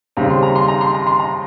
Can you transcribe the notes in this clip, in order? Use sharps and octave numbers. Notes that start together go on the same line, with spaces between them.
D#2 C#3 G3 C4 A#5
C6
A#5
C6
A#5
C6
A#5
C6
A#5